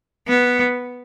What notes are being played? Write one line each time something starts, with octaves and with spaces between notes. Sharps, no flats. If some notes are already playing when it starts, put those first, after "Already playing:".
B3